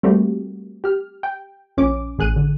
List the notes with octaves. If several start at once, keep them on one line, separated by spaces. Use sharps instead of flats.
G3 A3 A#3 C4 F#4 G4
G4 F6
G5
A#1 C#4 D6
A1 G#4 F#6 D#7
D3